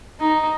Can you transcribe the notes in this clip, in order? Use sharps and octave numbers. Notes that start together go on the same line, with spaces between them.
D#4